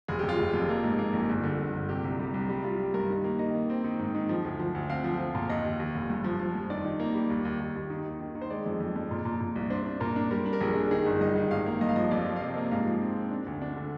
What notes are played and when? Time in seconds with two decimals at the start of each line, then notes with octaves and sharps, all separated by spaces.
0.08 F1 G#4
0.19 F1 G4
0.29 F4
0.39 F1 G4
0.54 F2
0.69 A#3
0.84 G#2
0.99 A#3
1.13 A#1
1.29 G1
1.43 D3
1.59 G1
1.74 G1
1.89 C3 G4
2.04 C2
2.19 G3
2.34 C2
2.49 G3 G4
2.64 G3 F4
2.79 G3 G4
2.94 G2 A#4
3.09 D#3
3.24 A#3
3.39 D#3 D#5
3.54 A#3
3.70 C4
3.84 D#3
3.99 G#2
4.14 D#3
4.29 F3
4.45 D2
4.60 F3
4.75 D2
4.89 C4 F5
5.04 F3
5.19 F3
5.35 A#2
5.50 D#2 D#5
5.65 D#2
5.80 D#2
5.95 F1
6.10 G2
6.24 F3
6.40 F3
6.55 G2
6.70 D#3 D5
6.85 D#3
7.00 A#3
7.15 G3
7.30 D#2
7.45 D#2
7.60 D#2
7.76 D#2
7.90 D#3
8.06 D#2
8.20 D#3
8.35 D#3
8.42 C5
8.50 G#3 D5
8.66 F2
8.80 F2
8.96 F2
9.11 A#2
9.25 A#2
9.40 A#2
9.56 C2
9.70 D4 C5
9.86 D4
10.00 A#2 A#4
10.16 D4
10.31 G3 A#4
10.46 D4
10.53 A#4
10.60 A#1 G#4
10.76 D4
10.91 D#3 G#4
11.06 G1
11.21 G2 D#5
11.36 D#3
11.51 G#1 F5
11.66 A#3
11.81 G2 D#5
11.89 F5
11.96 F3 D#5
12.11 F2 D5
12.26 F3
12.36 F5
12.41 C3 D#5
12.56 A#3
12.71 G#2 F5
12.86 F3
13.02 C4
13.16 C4
13.31 D4
13.47 D2
13.62 D4
13.76 D3